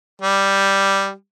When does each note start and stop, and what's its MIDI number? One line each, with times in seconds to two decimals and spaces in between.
0.22 1.12 55